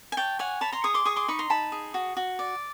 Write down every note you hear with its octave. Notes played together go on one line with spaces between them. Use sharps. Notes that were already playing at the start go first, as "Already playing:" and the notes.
G#5
C#5 G5 A5
C#5 F#5 G#5
C#5 A5 B5
A#5 C6
G#4 C#6 D#6
C6 D6
G#4 C#6 D#6
C6 D6
D#4 B5 C#6
A#5 C6
D#4 A5 B5
G#4
F#4
F#4
D5